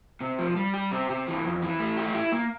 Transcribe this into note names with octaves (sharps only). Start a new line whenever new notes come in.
C3
F3
G3
G4
C3
C3
E3
F2
E3
A3
G4
E4
A#3